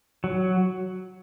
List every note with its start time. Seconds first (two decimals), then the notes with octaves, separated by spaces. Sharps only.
0.24 F#3